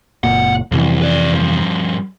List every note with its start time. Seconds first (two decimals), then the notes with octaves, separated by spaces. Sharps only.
0.24 F#1 A#2 F#5
0.72 C2 F2 C3 E3
1.02 B4 D5
1.32 G2 F3